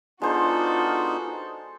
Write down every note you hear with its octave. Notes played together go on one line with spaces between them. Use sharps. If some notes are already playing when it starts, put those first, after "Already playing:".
G#3 B3 D4 D#4 F4 F#4 A4 C5